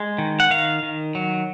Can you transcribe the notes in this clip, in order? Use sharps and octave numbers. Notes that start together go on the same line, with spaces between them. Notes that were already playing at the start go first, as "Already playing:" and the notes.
Already playing: G#3
D#3
F#5
D#3 F5
D#3
F#3